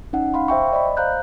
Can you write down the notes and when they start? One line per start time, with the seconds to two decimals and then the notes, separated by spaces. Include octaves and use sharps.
0.13 C#4 D#4 F#5
0.34 F5 B5 C6
0.48 C5 E5 G5 C#6
0.73 D5 D#5 B5
0.97 C5 F5 A#5 F#6 G6